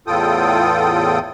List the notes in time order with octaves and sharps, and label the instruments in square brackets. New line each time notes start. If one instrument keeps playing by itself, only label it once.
[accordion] E2 A2 F4 A4 G5 D#6